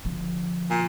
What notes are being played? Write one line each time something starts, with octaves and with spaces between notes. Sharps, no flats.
D3 F3
A#2